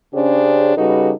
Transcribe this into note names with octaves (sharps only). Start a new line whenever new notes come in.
C#3 C#4 D4 G4 G#4 C5
C#3 G3 D#4 F#4 A4 B4